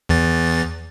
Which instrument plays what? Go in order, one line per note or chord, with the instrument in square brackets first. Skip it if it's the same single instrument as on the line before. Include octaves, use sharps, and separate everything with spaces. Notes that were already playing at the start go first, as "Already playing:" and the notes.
[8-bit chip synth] E2 E3 A6